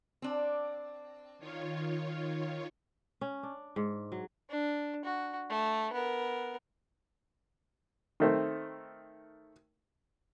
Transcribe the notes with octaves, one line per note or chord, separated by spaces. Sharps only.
C4 D4
D#3 F4 C#5
C#4
D4
G#2
F#3
D4
F#4
A3
B3 A#4
D#3 A3 C4